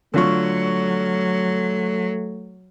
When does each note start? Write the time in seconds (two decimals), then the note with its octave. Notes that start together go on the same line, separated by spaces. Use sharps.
0.14 D3 F#3 A3 F4 C#6